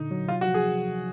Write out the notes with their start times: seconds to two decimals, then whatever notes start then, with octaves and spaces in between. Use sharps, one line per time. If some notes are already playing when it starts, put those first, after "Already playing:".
Already playing: A#2 D3 D#4
0.11 F#3
0.28 C3 F4
0.41 F#4
0.48 F3
0.54 G#4